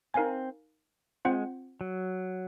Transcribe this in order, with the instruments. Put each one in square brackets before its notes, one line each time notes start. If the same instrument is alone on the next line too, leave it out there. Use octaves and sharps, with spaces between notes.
[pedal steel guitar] C4 [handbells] D#4 A#4 F5 G#5
[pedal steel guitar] G#3 [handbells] C4 F4 C5 F#5
[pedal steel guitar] F#3